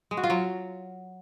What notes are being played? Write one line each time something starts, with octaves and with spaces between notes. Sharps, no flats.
G#3
F#4
F4
F#3